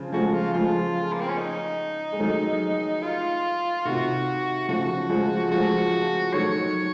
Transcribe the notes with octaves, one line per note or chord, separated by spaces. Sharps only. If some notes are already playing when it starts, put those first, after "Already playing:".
Already playing: C#3 F3
F3 G#3 F#4
F4
F3 G#3 F4
A#3
C4
C#4
D#4
G#3
D#3 F#3
F4
C3 D#3 F#4
C#3 F3 F#4
F3 G#3
F3 G#3 F#4
D#3 F#3 C#5